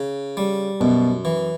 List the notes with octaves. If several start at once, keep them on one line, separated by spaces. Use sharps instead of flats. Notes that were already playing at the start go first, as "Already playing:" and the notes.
Already playing: C#3
G3
F#2 B2
E3